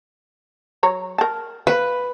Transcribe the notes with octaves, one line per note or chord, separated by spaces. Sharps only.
F#3 C#5 A#5
A#4 A5
B4 F5